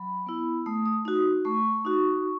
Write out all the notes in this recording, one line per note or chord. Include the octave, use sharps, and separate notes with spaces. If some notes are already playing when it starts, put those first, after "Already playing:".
Already playing: F#3 B5
B3 E4
A3 D#6
D#6
D#4 F#4 D#6
A3 C#6
D#4 F#4